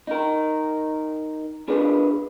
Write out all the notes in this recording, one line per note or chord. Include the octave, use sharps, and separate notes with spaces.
D#4 A#4
D4 G#4 A#4 B4